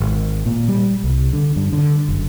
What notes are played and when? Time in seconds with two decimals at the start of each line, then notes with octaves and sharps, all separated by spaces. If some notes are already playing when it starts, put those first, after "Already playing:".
0.01 G#1
0.46 A#2
0.68 G3
1.04 C2
1.33 D3
1.56 G2
1.73 D3
2.09 F#1